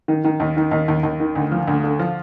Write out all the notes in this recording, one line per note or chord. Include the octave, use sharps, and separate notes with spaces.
D#3
D#3
D#2
D#3
D#2
D#2
D#2
D#3
D2
F3
D2
D3
F3